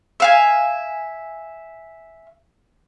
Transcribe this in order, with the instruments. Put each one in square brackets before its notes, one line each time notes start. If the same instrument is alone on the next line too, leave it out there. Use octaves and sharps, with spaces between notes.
[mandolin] E5 F5 G#5